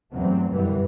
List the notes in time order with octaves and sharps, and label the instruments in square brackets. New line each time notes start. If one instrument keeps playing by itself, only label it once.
[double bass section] E2 G2 F#3 A3 C4
F#2 B2 D3 E3 G3